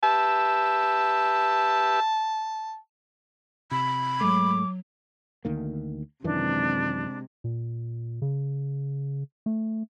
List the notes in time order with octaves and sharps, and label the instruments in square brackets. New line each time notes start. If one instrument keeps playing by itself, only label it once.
[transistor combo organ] G4 B4 E5 [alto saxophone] A5
[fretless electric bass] C3 [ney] B5
[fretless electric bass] G#2 G#3 A3 [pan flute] F#3 [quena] D6
[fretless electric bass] D2 D#3 A#3
[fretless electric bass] F#2 D#3 E3 [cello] C3 G#3 [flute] D4
[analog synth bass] A#2
C#3
A3